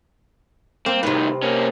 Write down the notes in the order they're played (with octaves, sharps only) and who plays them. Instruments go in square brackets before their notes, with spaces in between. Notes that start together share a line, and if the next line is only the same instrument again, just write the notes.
[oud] A#3 [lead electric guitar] C4
[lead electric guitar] A2 D#3 [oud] C3 B4
[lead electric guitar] A#3 C#4